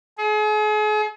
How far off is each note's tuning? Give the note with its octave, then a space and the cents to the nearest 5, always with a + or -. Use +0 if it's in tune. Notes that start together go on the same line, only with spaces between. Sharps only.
G#4 +40